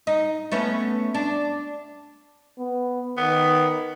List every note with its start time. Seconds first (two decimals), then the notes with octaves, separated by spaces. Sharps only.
0.07 D#4
0.52 A3 B3 C#4
1.14 D4
2.58 B3
3.17 D#3 B3